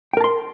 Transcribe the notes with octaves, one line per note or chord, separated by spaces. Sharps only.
A#4 G5 A5 C6